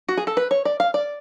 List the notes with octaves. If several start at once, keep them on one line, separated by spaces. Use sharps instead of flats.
F#4
G#4
A4
B4
C#5
D5
F5
D5